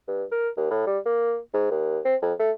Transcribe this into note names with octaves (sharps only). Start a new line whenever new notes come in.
G2
A#4
D#2
A2
G3
A#3
G#2
D#2
C4
F2
A3